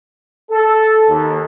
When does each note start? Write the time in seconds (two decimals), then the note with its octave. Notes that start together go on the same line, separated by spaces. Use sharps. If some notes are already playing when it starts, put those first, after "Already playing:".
0.50 A4
1.08 D#2